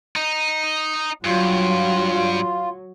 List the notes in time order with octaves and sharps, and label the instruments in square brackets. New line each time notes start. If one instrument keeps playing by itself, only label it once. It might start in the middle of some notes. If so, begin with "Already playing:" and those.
[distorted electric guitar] D#4
[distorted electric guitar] G2 [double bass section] F#3 [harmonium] F4